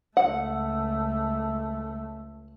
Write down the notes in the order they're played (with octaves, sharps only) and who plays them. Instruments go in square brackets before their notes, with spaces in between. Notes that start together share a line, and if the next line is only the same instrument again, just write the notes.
[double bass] C#2 A3 [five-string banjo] F#5